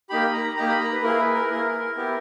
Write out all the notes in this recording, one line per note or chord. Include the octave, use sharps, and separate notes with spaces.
A#3 D#4 G4 B5
B5
A#5
A#3 D#4 G4 A#5
B5
A#5
B4
A#3 E4 G#4 A#4
B4
A#4
A#3 E4 G#4
B3 E4 G4